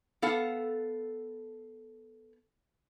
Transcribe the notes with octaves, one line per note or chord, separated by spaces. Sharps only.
B3 A4 F5 F#5